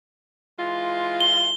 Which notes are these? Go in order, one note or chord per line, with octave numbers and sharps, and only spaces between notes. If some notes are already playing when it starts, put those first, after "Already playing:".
E3 G#3 F4
G7